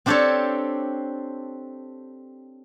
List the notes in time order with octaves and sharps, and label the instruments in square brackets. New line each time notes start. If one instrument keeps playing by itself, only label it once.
[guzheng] C4 D4 G4 A4 C5 C#5